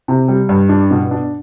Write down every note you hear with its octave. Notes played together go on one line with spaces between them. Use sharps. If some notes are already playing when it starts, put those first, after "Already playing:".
C3
G3
G2
D4
B2
D4